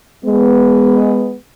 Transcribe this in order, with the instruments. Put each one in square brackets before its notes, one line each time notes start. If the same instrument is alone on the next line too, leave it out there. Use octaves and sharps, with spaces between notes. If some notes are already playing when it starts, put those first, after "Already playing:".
[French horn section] G#3 B3